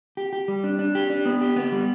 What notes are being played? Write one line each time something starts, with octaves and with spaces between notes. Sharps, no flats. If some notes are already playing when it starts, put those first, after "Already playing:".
G4
G4
G3
D4
D4
G4
D4
B3
G4
B3
G3